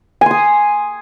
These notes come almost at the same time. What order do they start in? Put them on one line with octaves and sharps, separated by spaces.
G#5 C6 D#6